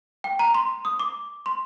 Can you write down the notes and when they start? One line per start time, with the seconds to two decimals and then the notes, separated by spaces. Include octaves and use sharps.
0.24 G5
0.39 A#5
0.54 C6
0.85 D#6
1.00 D6
1.46 C6